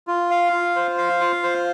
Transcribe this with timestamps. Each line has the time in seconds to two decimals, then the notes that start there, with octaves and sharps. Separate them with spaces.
0.07 F4
0.31 F5
0.53 F4
0.76 C5
0.98 F5
1.21 F4
1.43 C5